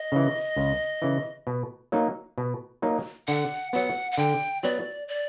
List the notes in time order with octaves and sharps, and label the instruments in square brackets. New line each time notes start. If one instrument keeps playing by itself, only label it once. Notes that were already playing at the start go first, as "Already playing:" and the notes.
Already playing: [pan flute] D#5
[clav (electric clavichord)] C#3 E3
C#2
C#3 E3
B2
F#3 A#3 D#4
B2
F#3 A#3 D#4
[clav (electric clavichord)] D3 [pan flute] F#5
[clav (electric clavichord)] F#3 B3 [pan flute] F#5
[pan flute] F#5
[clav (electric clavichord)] D3 [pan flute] G5
[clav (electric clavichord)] F#3 B3 [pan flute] D5
[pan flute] D5